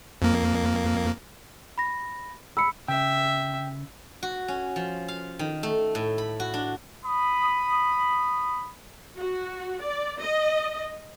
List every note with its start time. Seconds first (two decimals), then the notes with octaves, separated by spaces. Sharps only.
0.22 F2 A#3
1.78 B5 A#6
2.57 B5 E6 C#7
2.88 C#3 E5 G5
4.23 F#4
4.48 C#4
4.76 F3
5.08 F5
5.39 D#3
5.63 A3
5.95 A2
6.18 B5
6.40 F#4
6.54 D4
7.05 B5 D#6
9.18 F#4
9.82 D5
10.22 D#5